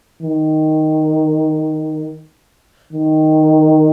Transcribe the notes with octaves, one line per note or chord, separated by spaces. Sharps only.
D#3
D#3